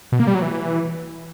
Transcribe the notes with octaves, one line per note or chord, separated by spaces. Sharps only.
B2
A#3
G3
F#3
E3